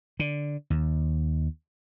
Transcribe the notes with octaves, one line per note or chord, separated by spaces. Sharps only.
D3
D#2